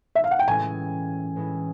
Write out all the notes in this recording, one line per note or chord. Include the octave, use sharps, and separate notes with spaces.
E5
F5
F#5
G5
A2 E3 G#3 C#4 E4 G#5
A2 E3 G#3 C#4 E4